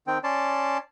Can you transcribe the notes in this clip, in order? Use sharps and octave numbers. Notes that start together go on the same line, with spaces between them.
D#3 C4 G5
C#4 D5 A5 C6